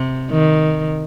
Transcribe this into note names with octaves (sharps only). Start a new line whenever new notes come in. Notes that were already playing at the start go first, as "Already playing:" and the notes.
Already playing: C3
D#3